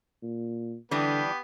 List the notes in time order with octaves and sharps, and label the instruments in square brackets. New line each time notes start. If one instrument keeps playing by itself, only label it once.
[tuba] A#2
[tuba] D3 [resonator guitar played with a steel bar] E3 G3 D4 [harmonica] B3 G4